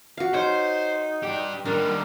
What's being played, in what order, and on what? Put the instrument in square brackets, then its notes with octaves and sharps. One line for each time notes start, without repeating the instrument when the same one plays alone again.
[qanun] F#4 F5
[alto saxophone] D#4 [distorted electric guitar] C5 [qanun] C#5
[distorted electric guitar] D4 G4
[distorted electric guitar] D#3 G3 [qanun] D4 [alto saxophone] A#4